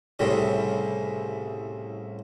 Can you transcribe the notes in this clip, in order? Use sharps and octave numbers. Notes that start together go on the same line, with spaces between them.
C2 A2 C#3